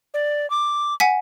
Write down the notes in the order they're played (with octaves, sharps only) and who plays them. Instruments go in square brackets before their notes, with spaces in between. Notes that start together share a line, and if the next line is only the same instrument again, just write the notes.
[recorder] D5
D6
[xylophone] F#5 G#5 B6